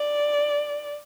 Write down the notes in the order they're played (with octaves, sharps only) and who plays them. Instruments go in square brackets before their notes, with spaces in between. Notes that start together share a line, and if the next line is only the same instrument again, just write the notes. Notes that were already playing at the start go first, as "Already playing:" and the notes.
Already playing: [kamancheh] D5